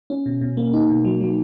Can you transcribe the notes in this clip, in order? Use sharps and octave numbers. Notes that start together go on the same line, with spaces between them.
C#4
B2
B2
A#3
D#4
B2
F#3
F#3